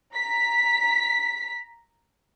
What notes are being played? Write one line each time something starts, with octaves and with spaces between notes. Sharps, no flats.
A#5 B6